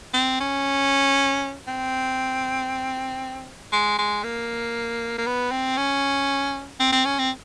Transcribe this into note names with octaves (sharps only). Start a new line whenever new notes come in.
C4
C#4
C4
G#3
G#3
A#3
A#3
B3
C4
C#4
C4
C4
C#4
C4